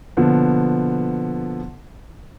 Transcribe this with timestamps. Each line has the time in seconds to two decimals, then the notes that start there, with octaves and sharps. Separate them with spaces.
0.17 B2 D3 F3 A#3 B3